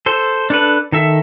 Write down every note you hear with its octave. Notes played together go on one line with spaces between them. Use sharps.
A4 C5
D4 A4 B4
D#3 A4 E5